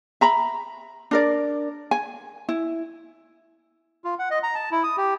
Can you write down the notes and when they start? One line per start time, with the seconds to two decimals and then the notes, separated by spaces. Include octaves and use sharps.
0.21 E5 A#5 B5
1.11 D4 A#4 D5
1.91 G#5
2.49 E4
4.04 F4
4.19 F#5
4.30 D#5
4.43 A#5
4.55 A5
4.72 E4
4.83 D#6
4.97 G4